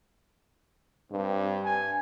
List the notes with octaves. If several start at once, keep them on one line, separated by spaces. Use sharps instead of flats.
G2 C4
G#5